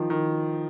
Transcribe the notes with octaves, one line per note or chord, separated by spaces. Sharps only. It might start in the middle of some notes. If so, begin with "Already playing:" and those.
Already playing: D#3 F3
D#3